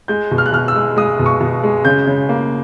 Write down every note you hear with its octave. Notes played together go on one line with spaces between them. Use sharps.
G#3 G6
B2
F6
F#6
B2 F6
E6
G#3
G#3 D#6
B2
C#6
B2
G#3
C#3 G6
C#3
A#3